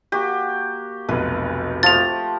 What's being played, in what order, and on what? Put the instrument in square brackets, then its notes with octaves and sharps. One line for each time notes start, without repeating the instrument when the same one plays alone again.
[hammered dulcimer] A#3 F#4 [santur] G4
[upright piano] F1 B1 [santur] B4
[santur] F3 [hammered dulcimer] A3 F4 G4 [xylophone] A6 F7